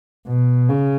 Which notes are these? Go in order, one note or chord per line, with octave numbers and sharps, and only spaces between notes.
B2
C#3